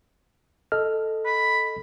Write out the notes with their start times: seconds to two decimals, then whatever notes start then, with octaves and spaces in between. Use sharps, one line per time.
0.72 A4 D#5 F6
1.26 B5